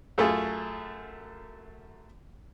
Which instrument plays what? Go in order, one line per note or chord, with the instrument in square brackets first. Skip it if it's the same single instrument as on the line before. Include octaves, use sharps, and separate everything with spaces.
[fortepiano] F#2 A3 F4 G#4